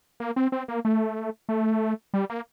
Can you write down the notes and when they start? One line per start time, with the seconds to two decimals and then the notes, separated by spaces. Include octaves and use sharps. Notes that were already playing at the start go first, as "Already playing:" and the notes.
0.20 A#3
0.36 C4
0.52 C4
0.68 A#3
0.85 A3
1.49 A3
2.14 G3
2.30 A#3